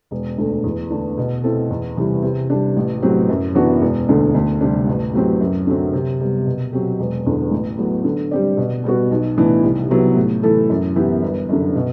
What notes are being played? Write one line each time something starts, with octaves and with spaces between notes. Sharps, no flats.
E1
D2 D3 A3
E2
D3 A3 D4
B2
A3 C4 E4 A4
E2
C3 E3 G3
C3
G3 D4
A1
A2 F#3 C4 G4
F#2
E3 B3 D4 F#4
E1
D2 D3
D2
C3 G3 D4
A1
A2 F#3 C4 G4
F#2
D3 F#3 C4
C3
G3 B3
B2
F#3 C4 G4
E1
E2 D3
A1
A2 F#3 B3
D3
G3 C4 G4 D5
B2
G3 B3 F#4
B1
A2 E3 B3 D4
C2
C3 F#3 B3 E4
A2
E3 A3 E4 A4
F#2
E3 B3 E4 G4
G1
F#2 D3
B2